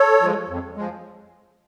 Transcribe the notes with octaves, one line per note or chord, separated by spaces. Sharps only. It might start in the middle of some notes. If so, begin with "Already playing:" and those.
Already playing: A4 C#5
F3 G#3
F2
F3 G#3